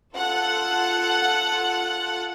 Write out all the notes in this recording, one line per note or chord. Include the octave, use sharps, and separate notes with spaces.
F4 A4 F#5